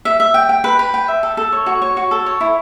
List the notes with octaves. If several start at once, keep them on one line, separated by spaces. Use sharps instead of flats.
E5
E5
G5
G5
B4
B4
G5
E5
A4
A4
C#5
F#4
C#5
F#4
A4
C#5
E4